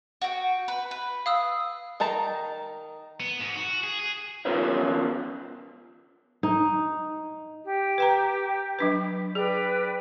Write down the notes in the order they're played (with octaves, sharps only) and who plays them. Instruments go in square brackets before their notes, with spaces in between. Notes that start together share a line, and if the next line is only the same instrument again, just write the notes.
[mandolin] F#4 G5
B4
B4
[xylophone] F5 D#6 E6
[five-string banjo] D#3 D#4 A5 A#5
[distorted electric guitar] B3
G#2
F#4
G#4
G#4
[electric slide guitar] B3 C#4 F4 A#4 B4 C#5
[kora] D#4
[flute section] G4
[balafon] B4 G5 A#5
F#3 D4 B4
[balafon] G#4 [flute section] B4 D5 G5